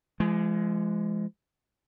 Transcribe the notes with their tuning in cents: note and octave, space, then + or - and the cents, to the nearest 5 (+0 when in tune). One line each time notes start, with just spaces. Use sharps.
F3 -40 G#3 +10